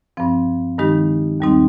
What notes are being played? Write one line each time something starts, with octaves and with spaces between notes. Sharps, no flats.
G2 F3 C4
G2 D#3 G#3 D#4 G4
D#2 D#3 G3 C4 D#4